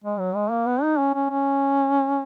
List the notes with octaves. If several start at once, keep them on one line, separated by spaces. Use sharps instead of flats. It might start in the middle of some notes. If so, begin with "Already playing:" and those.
G#3
F#3
G#3
A#3
B3
D#4
C#4
C#4
C#4